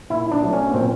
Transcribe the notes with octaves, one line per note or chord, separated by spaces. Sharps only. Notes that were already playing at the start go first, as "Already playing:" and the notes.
A#2 E4
D4
F#3 A3
C#4
A#2 C4